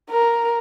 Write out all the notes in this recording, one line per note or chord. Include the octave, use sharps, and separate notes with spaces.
A#4